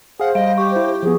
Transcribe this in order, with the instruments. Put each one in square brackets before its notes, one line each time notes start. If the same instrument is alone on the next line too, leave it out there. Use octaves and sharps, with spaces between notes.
[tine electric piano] G#4 F5 [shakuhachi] C5 [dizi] F#5
[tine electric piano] G3 [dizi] D#5 [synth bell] F5
[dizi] G4 [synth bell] C#6
[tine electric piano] E4
[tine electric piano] F3 B3 [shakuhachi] G#4